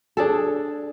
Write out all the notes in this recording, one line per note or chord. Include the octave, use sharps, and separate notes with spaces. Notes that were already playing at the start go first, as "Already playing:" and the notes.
D4 G#4 A4